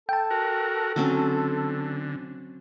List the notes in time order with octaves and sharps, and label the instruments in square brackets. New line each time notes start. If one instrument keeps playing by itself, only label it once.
[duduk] A4 [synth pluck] G5 A5
[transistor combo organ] F#4 A#4
[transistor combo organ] D3 [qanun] F#3 C4 C#4